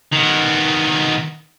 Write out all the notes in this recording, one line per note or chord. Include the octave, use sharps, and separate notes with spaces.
D#3 B3